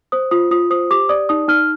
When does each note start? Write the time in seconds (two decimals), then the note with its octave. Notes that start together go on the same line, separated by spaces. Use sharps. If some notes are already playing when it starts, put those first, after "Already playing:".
0.12 C5 D#6
0.31 F4 D#6
0.51 F4 D#6
0.70 C5 D#6
0.91 G4 D6
1.09 D5 D#6
1.29 D#4 D#6
1.48 D#4 F6